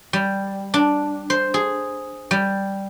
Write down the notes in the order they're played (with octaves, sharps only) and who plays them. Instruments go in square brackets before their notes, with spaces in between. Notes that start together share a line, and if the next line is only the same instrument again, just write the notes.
[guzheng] G3
D4
C5
G#4
G3